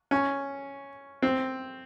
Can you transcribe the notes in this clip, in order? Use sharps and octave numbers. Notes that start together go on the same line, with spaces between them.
C#4
C4